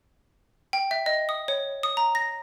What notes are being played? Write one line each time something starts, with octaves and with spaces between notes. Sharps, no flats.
G5
E5
D#5
D#6
C#5
D#6
A#5
A#6